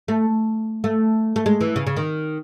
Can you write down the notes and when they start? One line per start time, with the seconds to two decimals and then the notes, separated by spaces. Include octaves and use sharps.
0.08 A3
0.84 A3
1.36 A3
1.46 G#3
1.61 E3
1.76 C#3
1.87 C#3
1.97 D#3